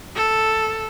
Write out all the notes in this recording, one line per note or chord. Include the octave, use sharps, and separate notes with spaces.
A4